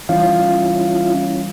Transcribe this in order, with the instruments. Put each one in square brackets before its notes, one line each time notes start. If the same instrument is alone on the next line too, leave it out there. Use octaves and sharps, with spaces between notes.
[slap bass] E3 G3 [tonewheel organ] C#4 E4 F4 [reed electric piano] F5